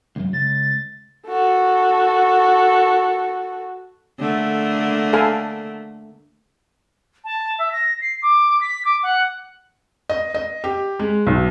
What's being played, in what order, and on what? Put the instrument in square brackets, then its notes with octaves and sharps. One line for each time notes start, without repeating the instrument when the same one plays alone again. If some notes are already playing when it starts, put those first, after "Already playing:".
[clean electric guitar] C#2 F#2
[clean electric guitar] C#2 [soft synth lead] A6
[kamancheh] F#4 A4
[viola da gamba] D3 A3 A#3
[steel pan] A4 F5 G#5
[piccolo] A5
E5
A#6
C7
D6
B6
D6
F#5
[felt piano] D#5
D#5
G4
G#3
B1